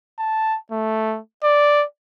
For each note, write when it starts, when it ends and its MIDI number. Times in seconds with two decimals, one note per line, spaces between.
0.19 0.57 81
0.72 1.19 57
1.44 1.84 74